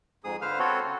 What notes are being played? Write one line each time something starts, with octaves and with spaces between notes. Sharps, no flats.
F2 G#2 G#4 D#6
D3 B4 C5 F5 F6
B3 C4 F#4 A4 C#5
C#3